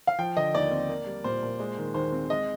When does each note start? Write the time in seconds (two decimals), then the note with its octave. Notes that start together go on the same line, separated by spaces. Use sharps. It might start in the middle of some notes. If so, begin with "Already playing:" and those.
0.07 F5
0.19 F3 G5
0.37 D3 D#5
0.55 D#2 D5
0.71 C4
0.89 A#3
1.07 G3
1.24 A#2 C5
1.43 A#2
1.60 G#3
1.78 D#3
1.94 D#2 C5
2.12 C4
2.30 G#3 D#5